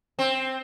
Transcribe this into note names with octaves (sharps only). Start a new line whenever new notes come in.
C4